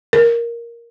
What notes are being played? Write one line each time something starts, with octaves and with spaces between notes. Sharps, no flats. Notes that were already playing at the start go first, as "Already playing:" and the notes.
A#4